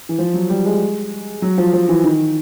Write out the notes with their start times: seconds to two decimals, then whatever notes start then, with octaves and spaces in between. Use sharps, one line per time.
0.09 E3
0.18 F3
0.34 F#3
0.49 G3
0.65 G#3
1.42 F#3
1.58 F3
1.73 F3
1.89 E3
2.04 D#3